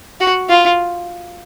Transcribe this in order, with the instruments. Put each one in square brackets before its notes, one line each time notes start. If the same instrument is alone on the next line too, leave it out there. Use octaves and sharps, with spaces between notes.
[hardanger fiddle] F#4
F4